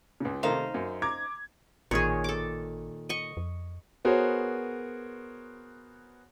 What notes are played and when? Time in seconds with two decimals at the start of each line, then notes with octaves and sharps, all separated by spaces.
0.20 C#2 C#3
0.43 C3 D#3 A3 D#4 C5 F5
0.74 F#2
1.02 A#5 D6 G#6
1.91 A1 A#2 D#3 G#4 C#5
2.24 A4 D6
3.09 D#5 C#6
3.37 F2
4.05 B3 F#4 G#4 A#4 C5 C#5